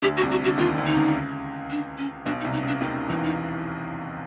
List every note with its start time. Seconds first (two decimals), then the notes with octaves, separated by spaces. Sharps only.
0.02 D2 D3 G4
0.17 F#4
0.22 C2 C3
0.31 F#4
0.44 F#4
0.48 D3
0.58 D#2 D#3 F4
0.77 D2 D3
0.86 D#4
0.95 C#2 C#3
1.71 D4
1.98 C#4
2.25 B1 B2 D4
2.40 D#4
2.44 C2 C3
2.53 D#4
2.63 C#2 C#3 D4
2.81 D#2 D#3 C#4
3.09 E2 E3 D#4
3.23 D#4